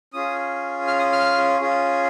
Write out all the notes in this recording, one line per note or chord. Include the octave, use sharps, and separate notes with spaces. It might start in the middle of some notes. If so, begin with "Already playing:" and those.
C#4 F4 G#4 D#6
F6
D#6
F6
C#4 F4 G#4